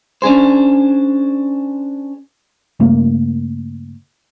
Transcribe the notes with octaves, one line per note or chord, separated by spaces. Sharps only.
C#4 D4 G#4 C5
G2 C#3 A3 A#3